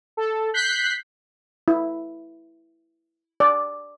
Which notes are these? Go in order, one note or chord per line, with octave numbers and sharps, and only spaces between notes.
A4
F#6 G6 B6 C7
E4
D5